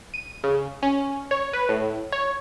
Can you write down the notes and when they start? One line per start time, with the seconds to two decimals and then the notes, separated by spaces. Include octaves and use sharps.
0.14 D#7
0.44 C#3
0.82 C#4
1.31 C#5
1.53 B4
1.69 A2
2.12 C#5